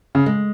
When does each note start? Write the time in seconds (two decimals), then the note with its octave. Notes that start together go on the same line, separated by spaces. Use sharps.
0.15 C#3
0.26 G#3